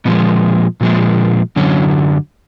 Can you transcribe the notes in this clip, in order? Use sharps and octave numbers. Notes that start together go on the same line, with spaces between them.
A#2 F3 G#3 B3
A#2 F3 G#3
F#2 D3 F#3 C#4